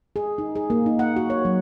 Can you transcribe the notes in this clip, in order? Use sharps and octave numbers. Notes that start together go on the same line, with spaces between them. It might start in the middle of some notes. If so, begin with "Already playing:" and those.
G#4
D#4
G#4
A#3
D#4
F#5
F#4
C#5
F#3